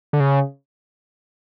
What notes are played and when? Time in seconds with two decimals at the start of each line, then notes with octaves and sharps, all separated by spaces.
0.13 D3
0.20 C#3